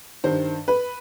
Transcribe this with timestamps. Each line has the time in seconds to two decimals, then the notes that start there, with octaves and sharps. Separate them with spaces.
0.24 G2 D#3 C5
0.68 B4